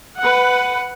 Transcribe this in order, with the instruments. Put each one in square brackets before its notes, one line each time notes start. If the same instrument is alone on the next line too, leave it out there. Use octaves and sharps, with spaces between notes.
[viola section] B4 F#5